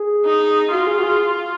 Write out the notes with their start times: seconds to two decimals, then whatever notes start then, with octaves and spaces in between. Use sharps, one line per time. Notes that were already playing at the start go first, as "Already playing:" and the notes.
Already playing: G#4
0.25 D#4
0.71 F4 F#4
0.87 G#4
0.99 F#4
1.04 G#4